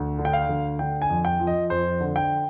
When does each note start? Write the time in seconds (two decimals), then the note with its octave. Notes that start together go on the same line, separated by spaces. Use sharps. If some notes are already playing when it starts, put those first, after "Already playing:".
Already playing: D2
0.19 D3
0.25 G5
0.33 F5
0.49 D2
0.79 D3 G5
1.02 G#5
1.09 F2
1.25 G5
1.39 F3
1.47 D#5
1.70 F2 C5
2.00 D3
2.16 G5